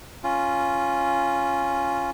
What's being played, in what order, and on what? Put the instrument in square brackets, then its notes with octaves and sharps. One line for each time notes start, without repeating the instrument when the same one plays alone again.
[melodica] C#4 F4